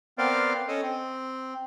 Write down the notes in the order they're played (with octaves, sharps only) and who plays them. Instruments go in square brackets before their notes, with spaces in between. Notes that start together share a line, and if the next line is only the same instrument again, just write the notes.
[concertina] B3 C4 A#4 C5 D5 F5
C#4 A4 D#5
C4